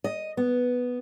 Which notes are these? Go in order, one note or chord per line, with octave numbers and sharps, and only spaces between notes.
D#5
B3